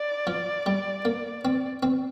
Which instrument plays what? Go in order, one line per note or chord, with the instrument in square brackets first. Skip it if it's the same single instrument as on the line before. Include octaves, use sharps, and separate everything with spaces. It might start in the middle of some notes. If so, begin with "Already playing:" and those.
Already playing: [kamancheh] D5
[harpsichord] F3
G3
A#3
C4
C4